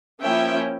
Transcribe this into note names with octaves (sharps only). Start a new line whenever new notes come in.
F3 A#3 C#4 E4 E5 G5